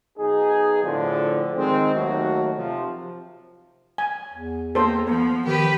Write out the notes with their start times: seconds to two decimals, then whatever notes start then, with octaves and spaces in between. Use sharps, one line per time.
0.17 B1 D#4 G#4
0.83 A2 D3 F3
1.55 D#3 G#3 C4
1.94 D#2 F#3 A3 F#4
2.57 C3 F3
3.98 G#5
4.33 E2
4.75 A#3 A4 C5
5.07 F3 B3
5.46 D#3 G4 B4